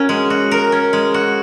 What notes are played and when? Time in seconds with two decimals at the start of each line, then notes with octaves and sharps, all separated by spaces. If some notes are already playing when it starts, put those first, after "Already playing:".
Already playing: C#4 F#4 A#4
0.09 G#3
0.30 F#4
0.51 A#4
0.72 C#4
0.93 G#3
1.14 F#4